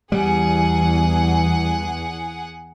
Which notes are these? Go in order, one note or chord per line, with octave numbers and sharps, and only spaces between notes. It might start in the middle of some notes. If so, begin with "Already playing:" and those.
E2 G3 G#4 F#5